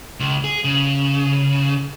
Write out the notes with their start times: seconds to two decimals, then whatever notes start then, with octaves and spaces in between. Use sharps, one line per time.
0.20 C#2
0.44 G#4
0.65 C#3